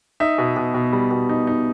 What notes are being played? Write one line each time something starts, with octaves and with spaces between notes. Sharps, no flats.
D#4 E5
B2
B2
B2
G3
B2
D#4
D#4